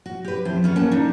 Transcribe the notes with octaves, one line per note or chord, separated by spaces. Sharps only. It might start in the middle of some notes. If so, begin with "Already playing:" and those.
F#4
G4 B4
F2 C4 E4 C5
B3 C#4 G#4 A4
A#3 C#4 F#5 A5
D4 D#4